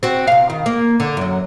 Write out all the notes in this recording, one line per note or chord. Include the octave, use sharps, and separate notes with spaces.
C4 F#4
C3 F5
D#3
A#3
D3
F#2 F#3